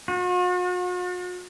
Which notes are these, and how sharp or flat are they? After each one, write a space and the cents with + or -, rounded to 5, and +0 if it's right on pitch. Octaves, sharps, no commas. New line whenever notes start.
F#4 -45